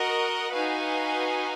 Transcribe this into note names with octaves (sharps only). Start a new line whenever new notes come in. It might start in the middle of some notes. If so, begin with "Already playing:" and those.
Already playing: F#4 A#4 D#5 F#5
D#4 F#4 B4 F5 G#5